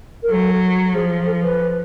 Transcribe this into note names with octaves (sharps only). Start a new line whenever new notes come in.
A#4
F#3 A4
F3 G#4
A4
B4